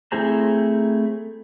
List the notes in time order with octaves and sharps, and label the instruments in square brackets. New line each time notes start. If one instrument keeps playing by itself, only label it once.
[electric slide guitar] A3 C4 E4 G#4 C5 A#5